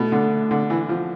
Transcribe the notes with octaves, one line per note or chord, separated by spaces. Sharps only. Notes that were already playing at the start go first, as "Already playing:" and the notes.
Already playing: B2 A3
D3
D3
E3
F3